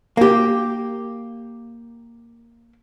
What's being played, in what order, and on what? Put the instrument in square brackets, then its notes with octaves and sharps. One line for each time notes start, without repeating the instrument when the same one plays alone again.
[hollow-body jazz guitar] A#3 G4